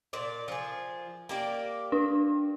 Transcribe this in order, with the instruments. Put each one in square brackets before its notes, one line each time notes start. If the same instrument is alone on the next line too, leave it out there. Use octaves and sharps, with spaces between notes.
[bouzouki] A#2 D5
F3 G#4
A#3 G4 D5
[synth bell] D4